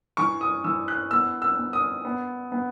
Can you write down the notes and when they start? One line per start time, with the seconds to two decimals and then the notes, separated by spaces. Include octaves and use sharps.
0.17 E3 C#6
0.41 D#6
0.64 E3 E6
0.88 F#6
1.11 B3 E6
1.42 E6
1.57 B3
1.73 D#6
2.05 B3
2.52 B3